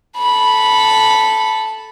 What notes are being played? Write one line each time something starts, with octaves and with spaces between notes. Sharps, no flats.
A4 B5